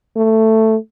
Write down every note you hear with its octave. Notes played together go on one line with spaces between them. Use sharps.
A3